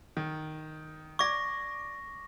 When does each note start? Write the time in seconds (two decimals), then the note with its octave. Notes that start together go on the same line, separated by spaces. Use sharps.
0.17 D#3
1.19 D5 C#6 D6 G#6 A#6